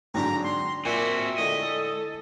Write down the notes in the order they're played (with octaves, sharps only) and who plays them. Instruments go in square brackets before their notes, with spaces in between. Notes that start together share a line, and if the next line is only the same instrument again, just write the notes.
[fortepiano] G#2 D3 F#3 [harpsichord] C4 D4 G4 [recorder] A#5
[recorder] C6
[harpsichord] A#2 D6 [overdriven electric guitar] C4 F#4 [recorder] E5 [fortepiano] G#5
[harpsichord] A2 D3 G#3 [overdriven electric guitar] D#5
[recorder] A4